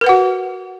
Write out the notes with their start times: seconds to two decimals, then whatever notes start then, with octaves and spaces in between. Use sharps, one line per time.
0.01 A#4
0.04 B4
0.07 F#5
0.09 F#4